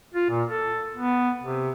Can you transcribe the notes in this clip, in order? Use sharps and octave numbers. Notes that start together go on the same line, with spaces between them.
F4
A#2
A4
B3
C3